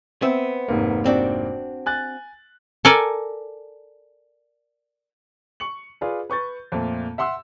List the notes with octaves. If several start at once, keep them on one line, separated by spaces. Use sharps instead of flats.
B3 C4 E5
F1 G#2 A#3
C4 D4 F#4
G#5 F#6 A6
A4 A#4 D5 G#5
C#6 C#7 F#7
F4 G#4 B4 D5
B4 C#6 G6 A6
F2 A#2 A3
E5 F#5 C6 E6